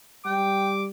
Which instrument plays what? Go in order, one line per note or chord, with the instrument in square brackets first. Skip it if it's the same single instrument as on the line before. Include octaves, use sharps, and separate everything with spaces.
[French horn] G3 [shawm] G5 [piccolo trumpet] D6